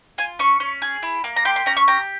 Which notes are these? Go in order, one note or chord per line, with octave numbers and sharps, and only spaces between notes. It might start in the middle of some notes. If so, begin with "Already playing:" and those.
F4 G#5
C#4 C#6
C#4
G#4
E4
A#3
A#5
G4 C6
C6
C#4 A#5
C#6
G4 A#5